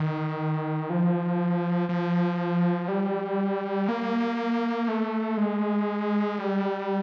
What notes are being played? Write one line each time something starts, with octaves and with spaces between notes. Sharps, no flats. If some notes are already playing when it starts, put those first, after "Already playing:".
Already playing: D#3
F3
F3
G3
A#3
A3
G#3
G3